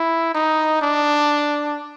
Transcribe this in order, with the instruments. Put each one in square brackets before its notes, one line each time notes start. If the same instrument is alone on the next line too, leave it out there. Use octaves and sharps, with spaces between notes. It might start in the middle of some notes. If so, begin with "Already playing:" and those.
Already playing: [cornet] E4
D#4
D4